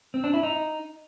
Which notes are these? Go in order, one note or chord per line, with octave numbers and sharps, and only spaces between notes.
C4
D4
E4
D#4